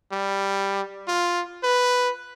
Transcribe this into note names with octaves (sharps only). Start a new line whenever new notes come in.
G3
F4
B4